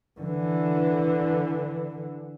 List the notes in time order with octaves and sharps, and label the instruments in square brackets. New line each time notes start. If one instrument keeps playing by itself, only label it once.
[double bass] D3 E3